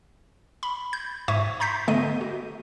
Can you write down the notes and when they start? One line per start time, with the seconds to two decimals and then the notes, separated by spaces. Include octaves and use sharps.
0.63 B5
0.93 G6
1.28 G#2 E5 C#6 G#6 D#7
1.60 A#5 C6 G6 A#6 B6
1.88 D3 A3 B3 A4 D#5 D#7
2.21 F#4